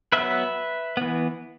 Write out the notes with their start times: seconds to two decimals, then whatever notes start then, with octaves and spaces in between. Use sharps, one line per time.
0.12 F#3 B3 B4 E5
0.97 E3 B3